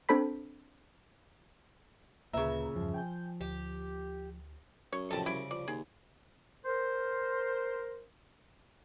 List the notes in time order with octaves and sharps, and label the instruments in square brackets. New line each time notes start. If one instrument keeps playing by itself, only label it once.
[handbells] C4 D4 A4 C5 B5 B6
[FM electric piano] D2 B4 A#5 [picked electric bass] A#2 [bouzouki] C#3 E5
[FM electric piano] E2 G2 [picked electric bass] F3
[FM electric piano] G5 G#5 G6
[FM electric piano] D2 [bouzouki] G4
[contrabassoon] F#2 [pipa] C#5
[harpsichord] F2 A2 C3 [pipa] A4 A5
[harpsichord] C2 C#3 D6 [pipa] E4
[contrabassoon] F3 [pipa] D5
[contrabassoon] D#2 [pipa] G#4
[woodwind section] A#4 C5